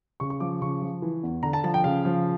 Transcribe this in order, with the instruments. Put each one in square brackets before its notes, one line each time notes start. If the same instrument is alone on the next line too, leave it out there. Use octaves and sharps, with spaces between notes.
[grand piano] C#3 C#6
C#6
F3 D6
C#3 C#6
F3
E3
E2
D3 A#5
A5
F3 A5
G5
C#3 F5
F3